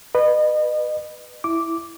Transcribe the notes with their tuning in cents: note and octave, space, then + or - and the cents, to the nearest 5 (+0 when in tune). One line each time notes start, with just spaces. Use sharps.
B4 +0 D#5 -35
E4 +0 D6 -5